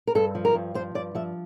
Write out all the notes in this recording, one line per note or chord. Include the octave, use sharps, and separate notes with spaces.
A#4
G2 A4
F3
A#4
G2
F3 C5
G2 D5
F3 E5